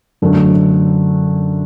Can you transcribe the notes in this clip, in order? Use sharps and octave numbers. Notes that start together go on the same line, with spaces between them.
F#2 D3 F#3 A3